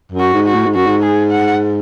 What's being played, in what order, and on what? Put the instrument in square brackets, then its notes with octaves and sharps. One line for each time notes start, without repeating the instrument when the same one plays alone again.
[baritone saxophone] F#2
[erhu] F#4
[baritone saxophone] G#2
[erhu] F#4
[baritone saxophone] A2
G#2
[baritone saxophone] F#2 [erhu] F#4
[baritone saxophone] G#2
[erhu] G#4
F#5